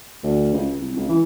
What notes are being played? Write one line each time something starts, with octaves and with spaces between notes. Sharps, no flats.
D2
C#2
C2
C#2
E3